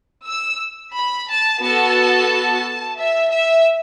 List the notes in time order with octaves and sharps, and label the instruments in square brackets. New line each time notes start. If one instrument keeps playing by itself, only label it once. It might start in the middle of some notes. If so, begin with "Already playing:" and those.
[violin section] E6
B5
A5
B3 F#4 A4 A5
E5
E5